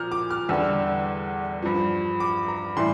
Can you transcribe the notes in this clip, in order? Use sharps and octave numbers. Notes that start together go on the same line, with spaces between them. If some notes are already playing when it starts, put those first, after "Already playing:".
Already playing: A#2 F3 A#5 F6 G6
D6
F6
E2 D3 G3 E6
G2 F3
D6
A#5
A2 E3 G3 C6